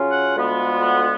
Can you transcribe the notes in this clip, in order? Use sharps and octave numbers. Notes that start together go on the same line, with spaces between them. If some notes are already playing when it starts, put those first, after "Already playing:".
Already playing: C#3 F#3 C#4 F4
F#5
D2 D3 G#3 B3 F4
F#5